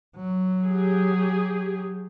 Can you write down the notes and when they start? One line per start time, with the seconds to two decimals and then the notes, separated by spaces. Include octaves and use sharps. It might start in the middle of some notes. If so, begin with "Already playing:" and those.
0.16 F#3
0.65 G4 G#4